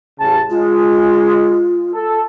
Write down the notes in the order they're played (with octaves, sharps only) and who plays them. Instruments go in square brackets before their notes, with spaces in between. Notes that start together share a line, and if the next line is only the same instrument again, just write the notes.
[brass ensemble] A1 C#3 A5
[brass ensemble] G#3 [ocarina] F4
[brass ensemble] A4